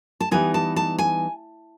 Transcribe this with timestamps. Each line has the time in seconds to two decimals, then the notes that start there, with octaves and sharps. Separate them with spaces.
0.20 A5
0.31 E3 G3 B3 D#4 G#5
0.54 A5
0.76 A5
0.99 G#5